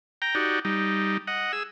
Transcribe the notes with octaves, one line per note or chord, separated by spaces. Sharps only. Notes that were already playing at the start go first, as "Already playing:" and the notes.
G5 A#5
D#4 F#4 G4 D5
G3 D#4
D#5 F#5
G#4 E6